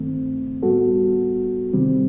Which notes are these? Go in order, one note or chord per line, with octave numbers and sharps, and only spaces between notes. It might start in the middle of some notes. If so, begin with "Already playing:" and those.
Already playing: G2 D#3 A3 C4
A2 G3 B3 F#4 A4
C3 D#3 G3 C4